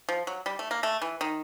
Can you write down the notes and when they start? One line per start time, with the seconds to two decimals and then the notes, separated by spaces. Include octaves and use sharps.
0.09 F3
0.27 F#3
0.46 G3
0.59 A3
0.71 A#3
0.83 A3
1.02 E3
1.21 D#3